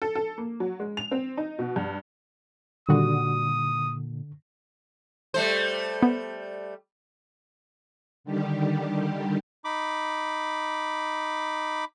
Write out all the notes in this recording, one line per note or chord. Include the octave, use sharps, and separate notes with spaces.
A4
A4
A#3
F#3
G#3
F7
C4
D#4
B2
G2
A#2 D3 D#3 G3 F#4 D#6
G3 A3 C5
B3
D3 D#3 G3 G4
D#4 B5 D6